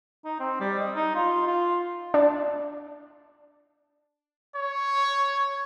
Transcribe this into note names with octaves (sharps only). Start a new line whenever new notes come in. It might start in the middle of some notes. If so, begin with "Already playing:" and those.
D#4
C4
G3
D#5
D#4
F4
F4
D4
C#5